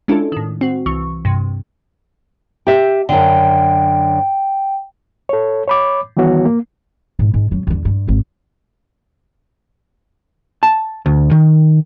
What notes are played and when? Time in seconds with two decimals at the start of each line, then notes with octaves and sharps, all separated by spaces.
0.08 G#3 C#4 D4 E4 F4 A4
0.32 A2 D#3
0.61 C4 F#4
0.86 C2 E3 C#6
1.25 G2 C3
2.67 G4 E5
3.09 F#2 D3 G5
5.29 A4 C#5
5.68 C#5 B5 D6
6.17 D#3 E3 G3 B3 F#4 C#5
6.45 A#3
7.19 G#2
7.34 G#2
7.51 F#2 F#3
7.67 E2 D3
7.85 G2
8.07 G#1 D#2
10.63 A5
11.06 D2
11.31 D#3